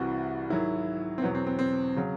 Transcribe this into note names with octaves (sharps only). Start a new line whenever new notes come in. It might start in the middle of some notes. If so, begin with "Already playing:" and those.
Already playing: C2 C3 E3 G3 F#4
G#2 D#3 F#3 E4
C4
E2 B2 F#3 B3
C4
C4
C4
C#3 F#3